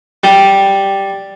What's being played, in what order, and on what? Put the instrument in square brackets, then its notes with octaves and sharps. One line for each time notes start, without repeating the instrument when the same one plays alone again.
[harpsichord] G3